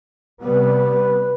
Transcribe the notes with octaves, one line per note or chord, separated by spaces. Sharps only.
C3 G3 B3 B4